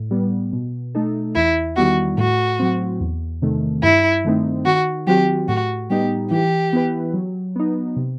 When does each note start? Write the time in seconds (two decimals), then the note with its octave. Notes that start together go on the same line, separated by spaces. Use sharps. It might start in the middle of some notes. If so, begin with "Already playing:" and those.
Already playing: A2
0.11 G3 B3
0.53 B2
0.95 A3 D#4 A4
1.36 E2 E4
1.76 D#3 G3 B3 E4 F#4
2.17 A2 F#4
2.59 F#3 C4
3.00 E2
3.42 C3 D#3 A3
3.83 G2 E4
4.25 D#3 A3 C4 D#4
4.66 D#3 F#4
5.07 F#3 C4 F#4 G4
5.48 A2 F#4
5.90 G3 B3 D#4 G4
6.31 E3 G4
6.73 B3 E4 B4
7.14 F#3
7.56 B3 D#4
7.96 C3